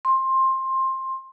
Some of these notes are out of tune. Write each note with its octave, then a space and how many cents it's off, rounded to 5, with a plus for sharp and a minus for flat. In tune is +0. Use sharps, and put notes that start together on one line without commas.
C6 +15